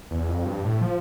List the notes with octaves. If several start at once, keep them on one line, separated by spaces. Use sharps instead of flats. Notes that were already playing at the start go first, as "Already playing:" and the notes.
E2
F2
G2
A2
F3